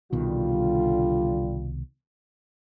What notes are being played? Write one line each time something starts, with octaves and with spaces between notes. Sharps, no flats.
C2 B2 D3 D#3 G3 F4